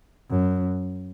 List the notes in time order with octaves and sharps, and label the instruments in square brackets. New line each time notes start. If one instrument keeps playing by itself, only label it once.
[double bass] F#2